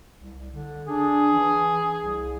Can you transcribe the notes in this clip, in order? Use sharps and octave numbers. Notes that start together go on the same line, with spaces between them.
C2
D3
D4 G#4
E3
C2